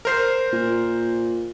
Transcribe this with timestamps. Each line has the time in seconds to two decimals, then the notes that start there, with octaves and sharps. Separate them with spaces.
0.05 A#4 C5 C7
0.53 A#2